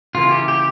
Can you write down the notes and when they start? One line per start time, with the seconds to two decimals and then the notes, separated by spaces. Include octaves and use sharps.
0.15 C#3 E3 A#3 C#4 F4
0.31 G4
0.48 G4